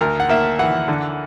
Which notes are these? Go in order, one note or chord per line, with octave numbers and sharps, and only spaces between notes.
D2 A#4
F#5
A#3 E5
E3 F#5
D3